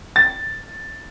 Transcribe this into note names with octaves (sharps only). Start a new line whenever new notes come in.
A6